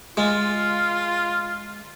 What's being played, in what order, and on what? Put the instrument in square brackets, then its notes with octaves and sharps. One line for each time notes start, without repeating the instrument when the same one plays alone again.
[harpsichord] G#3 [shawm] F4